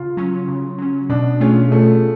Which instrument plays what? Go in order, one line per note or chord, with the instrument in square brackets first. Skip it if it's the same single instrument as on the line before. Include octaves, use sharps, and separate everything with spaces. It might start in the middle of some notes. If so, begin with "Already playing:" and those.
Already playing: [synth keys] C#3 [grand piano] F4
[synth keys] F#3 C#4
C#3
F#3 C#4
[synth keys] B2 [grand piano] D4
[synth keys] A3 F4 G#4 [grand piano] C#4
[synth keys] B2 [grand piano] A3